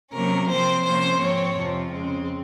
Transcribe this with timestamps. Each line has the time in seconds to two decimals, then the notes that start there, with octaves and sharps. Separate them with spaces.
0.13 C3 F#3 A#3 C#4 A#4
0.49 C3 F3 C4 C5
0.85 C3 F3 A#3 C#4 C5
1.20 G#2 F3 C4 C#5
1.56 F2 C3 F3 C4
1.92 F2 C#3 G#3 C4